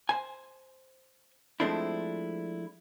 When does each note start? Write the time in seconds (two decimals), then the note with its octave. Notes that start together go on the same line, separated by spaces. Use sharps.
0.09 C5 G#5
1.60 F3 G#3 A3 C4 D4 E4